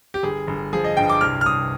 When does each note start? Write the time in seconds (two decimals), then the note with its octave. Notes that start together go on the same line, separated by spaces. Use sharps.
0.14 G4
0.23 G1 G#4
0.47 G1
0.73 F3 G#4
0.84 D#5
0.97 G2 G5
1.09 D6
1.21 C2 F6
1.41 F6
1.46 C2 D#6